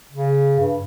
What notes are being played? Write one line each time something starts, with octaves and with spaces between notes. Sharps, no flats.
C#3
G2